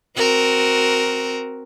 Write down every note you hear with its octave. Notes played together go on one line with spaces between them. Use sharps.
C4 F#4 A#4